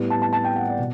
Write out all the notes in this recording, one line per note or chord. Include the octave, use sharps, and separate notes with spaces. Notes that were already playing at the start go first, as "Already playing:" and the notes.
Already playing: A2 G3 B3
A5
A5
A5
G5
F#5
D5
B2